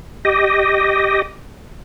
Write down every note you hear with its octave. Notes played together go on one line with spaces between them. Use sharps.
G4 D#5